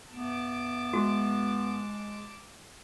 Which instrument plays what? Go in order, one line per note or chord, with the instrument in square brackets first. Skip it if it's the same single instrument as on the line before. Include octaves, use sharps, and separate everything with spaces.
[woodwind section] G2 A3 B3 [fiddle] A5 D6
[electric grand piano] G#3 [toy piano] F#4